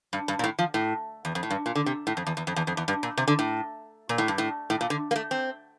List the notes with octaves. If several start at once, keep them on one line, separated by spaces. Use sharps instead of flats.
G2
G2
A#2
A2
F3
A2
E2
F2
A2
G2
A#2
D3
C3
A2
F2
E2
E2
F2
E2
F2
E2
G2
A#2
C3
D3
A2
A#2
A2
G2
A2
A2
A#2
D3
A#3
A3
C4